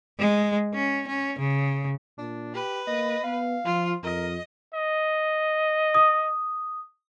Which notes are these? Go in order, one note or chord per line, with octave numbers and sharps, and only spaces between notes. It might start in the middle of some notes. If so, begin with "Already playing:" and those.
G#3
C#4
C#4
C#3
A#2 D4
G4 B4
A#3 D#5
B3 F5
F3 F4
F2 A#4 D#5
D#5
D#6